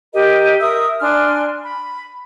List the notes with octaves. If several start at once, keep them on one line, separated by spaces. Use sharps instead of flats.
G4 A#4 D#5
A#4 E5 D#6 E6
D4 G#5 C6 F6
B5